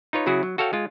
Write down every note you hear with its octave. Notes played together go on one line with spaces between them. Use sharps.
D#4 F4 B4 C#5
C#3 F#3 E4 F#4 G#4
F#3
F#4 A4 C#5 F5 G5
G#3 F4